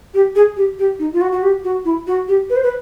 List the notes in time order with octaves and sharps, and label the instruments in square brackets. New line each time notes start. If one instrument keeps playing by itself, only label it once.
[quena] G4
G#4
G4
G4
D#4
F4
F#4
F#4
G4
F#4
E4
F#4
G4
B4
C5
B4